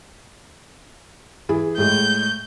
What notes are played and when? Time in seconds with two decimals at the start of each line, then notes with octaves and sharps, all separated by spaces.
1.49 E3 E4 G#4
1.78 A2 G#3 G6